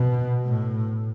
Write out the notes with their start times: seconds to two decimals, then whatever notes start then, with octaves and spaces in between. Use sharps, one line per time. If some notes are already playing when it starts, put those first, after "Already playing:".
Already playing: B2
0.45 A2